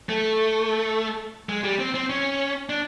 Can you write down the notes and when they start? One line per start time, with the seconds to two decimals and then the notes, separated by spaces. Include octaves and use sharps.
0.09 A3
1.49 G#3
1.64 G3
1.79 C4
1.94 C4
2.10 C#4
2.69 D4